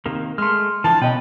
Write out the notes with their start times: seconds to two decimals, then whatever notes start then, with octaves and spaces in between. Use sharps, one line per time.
0.06 C3 D#3 A#3
0.38 G#3 A3 C6 F6
0.84 E3 F3 D4 A5
1.02 B2 C#4 B4 D#5 G5